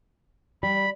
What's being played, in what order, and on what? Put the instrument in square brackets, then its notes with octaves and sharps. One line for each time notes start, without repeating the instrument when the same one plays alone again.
[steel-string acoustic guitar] G3 [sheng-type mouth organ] B5